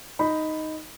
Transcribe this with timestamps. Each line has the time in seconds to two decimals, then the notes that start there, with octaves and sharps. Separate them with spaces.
0.19 D#4 B5